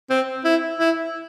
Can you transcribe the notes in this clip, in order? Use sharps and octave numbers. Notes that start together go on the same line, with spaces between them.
C4
E4
E4